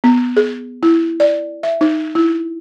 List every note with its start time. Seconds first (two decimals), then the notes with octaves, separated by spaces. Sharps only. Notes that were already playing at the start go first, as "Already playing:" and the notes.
0.04 B3
0.37 G#4
0.83 E4
1.20 D5
1.63 E5
1.81 D#4
2.15 E4